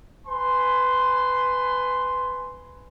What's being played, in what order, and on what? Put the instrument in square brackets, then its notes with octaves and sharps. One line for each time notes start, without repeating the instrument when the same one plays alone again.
[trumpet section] B4 G#5 C6